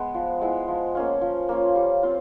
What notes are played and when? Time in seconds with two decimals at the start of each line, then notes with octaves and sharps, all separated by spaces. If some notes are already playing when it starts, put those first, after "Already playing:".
Already playing: G#3 B3
0.14 F3
0.41 G#3 B3 E4
0.68 F3
0.95 A#3 C#4 F4
1.21 F3
1.49 A#3 C#4 F4
1.76 G3
2.03 C4 F4